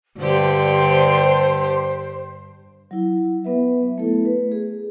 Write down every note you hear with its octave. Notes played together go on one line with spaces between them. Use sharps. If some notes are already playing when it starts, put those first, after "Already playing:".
G2 D3 G4 C5
F#3 E4
F#3 B3 B4 E5
A3 B3 E4 A4
B4
G#4